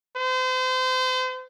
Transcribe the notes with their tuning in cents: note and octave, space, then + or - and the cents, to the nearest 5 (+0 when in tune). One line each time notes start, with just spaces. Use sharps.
C5 -35